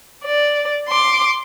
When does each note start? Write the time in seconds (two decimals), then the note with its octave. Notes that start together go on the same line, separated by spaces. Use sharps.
0.24 D5
0.88 C6 D6